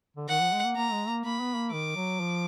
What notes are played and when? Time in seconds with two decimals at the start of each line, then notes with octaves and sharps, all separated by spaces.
0.17 D3
0.29 D#3 F#5
0.41 F3
0.53 G#3
0.65 A#3
0.76 A#3 A#5
0.92 G#3
1.08 A#3
1.25 A#3 B5
1.41 B3
1.56 A#3
1.72 D#3 D6
1.96 F#3
2.20 F3